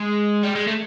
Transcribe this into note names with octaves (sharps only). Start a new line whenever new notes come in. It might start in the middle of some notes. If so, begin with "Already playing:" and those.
Already playing: G#3
G3
G#3
A3